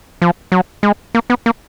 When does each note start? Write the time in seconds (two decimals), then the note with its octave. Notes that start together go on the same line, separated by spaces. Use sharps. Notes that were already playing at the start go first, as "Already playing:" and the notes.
0.22 F3
0.52 F#3
0.83 G#3
1.15 A#3
1.30 B3
1.46 A#3